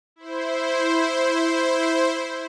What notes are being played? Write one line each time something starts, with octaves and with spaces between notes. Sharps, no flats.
E4 C5